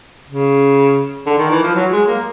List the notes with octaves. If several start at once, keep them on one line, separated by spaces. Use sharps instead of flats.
C#3
D3
D#3
E3
F3
F#3
G#3
A#3